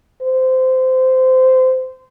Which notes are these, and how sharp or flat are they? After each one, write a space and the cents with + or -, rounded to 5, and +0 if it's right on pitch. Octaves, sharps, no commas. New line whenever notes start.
C5 -20